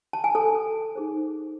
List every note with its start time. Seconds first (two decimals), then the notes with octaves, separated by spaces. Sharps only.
0.13 A5
0.24 G#5
0.35 A4 A5
0.95 D#4 G#4 C5